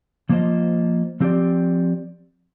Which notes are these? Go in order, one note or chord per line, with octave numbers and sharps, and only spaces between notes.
F3 A#3 F4 C5 D#5
F3 C4 G4 D5